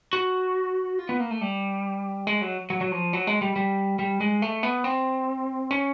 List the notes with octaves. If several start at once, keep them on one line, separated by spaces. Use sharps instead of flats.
F#4
F4
B3
A#3
A3
G3
G#3
F#3
F#3
F#3
F3
F#3
G#3
G3
G3
G3
G#3
A3
B3
C4
C#4